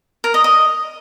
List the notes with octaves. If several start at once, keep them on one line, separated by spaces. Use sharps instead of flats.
A#4
D#5
D#5